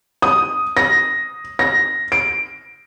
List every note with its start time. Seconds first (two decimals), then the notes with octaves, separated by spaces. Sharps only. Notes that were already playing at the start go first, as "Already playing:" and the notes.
0.22 D#6
0.77 A#6
1.59 A#6
2.12 D7